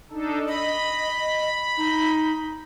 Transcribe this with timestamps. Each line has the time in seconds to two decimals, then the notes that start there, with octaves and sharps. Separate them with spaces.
0.12 D4 D#4 A4
0.48 D#5 B5
1.77 D#4